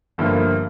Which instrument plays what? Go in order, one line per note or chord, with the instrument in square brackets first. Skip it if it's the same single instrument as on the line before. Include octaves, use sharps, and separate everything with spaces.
[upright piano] G1 G2 D3 F3 A#3